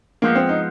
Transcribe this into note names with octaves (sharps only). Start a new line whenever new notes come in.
F3 G#3 A#3 B3
C4
D#4